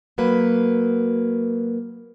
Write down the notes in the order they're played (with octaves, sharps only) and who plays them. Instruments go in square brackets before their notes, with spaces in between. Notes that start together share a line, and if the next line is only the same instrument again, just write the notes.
[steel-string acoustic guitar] F#3 A#3 B4